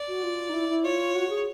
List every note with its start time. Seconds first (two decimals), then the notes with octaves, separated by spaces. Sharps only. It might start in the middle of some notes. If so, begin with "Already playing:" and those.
Already playing: D5
0.08 F#4
0.23 F4
0.49 D#4
0.54 E4
0.69 E4
0.84 F4 C#5
1.15 F#4
1.29 G#4